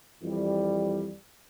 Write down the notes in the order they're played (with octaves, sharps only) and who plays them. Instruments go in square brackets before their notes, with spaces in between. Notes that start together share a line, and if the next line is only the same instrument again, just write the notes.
[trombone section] F2 E3 G3